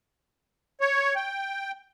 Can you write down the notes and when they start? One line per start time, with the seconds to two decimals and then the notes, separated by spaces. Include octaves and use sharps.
0.81 C#5
1.16 G5